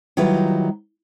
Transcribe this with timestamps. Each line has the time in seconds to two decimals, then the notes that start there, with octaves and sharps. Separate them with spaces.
0.17 D#3 F#3 G3 E4 F4 B4